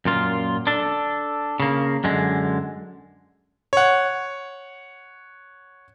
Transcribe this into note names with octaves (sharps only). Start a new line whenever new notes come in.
F#2 A#2 F4
D4 A4
C#3 A#3
F#2 D3 G#3
C#5 F#5